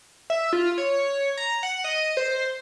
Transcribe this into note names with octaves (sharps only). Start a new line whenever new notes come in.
E5
F4
C#5
A#5
F#5
D#5
C5